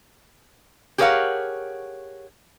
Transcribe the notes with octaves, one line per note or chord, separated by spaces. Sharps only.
G4 G#4 A#4 C#5 F5 F#5